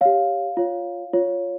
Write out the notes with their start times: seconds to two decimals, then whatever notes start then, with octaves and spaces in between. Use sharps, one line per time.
0.01 G4 C#5 F5
0.57 F4 C#5
1.13 F4 C#5